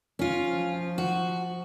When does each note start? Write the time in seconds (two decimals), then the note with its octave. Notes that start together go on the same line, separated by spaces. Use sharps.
0.19 C#4 F4
0.49 F3
0.98 F#4